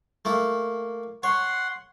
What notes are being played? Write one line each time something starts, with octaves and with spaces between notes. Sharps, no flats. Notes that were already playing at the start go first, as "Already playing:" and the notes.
A3 A#3 E4
C#5 F#5 C6